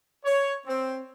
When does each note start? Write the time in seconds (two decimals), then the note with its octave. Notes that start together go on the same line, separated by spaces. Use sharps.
0.25 C#5
0.67 C4